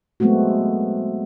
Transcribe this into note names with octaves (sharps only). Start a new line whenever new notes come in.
F#3 G#3 A3 B3 C4 F#4